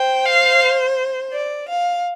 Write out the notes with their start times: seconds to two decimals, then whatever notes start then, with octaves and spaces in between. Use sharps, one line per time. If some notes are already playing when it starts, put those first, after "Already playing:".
Already playing: C5 G5
0.25 F5
1.32 D5
1.69 F5